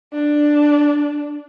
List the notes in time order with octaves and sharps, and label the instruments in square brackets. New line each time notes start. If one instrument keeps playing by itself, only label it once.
[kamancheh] D4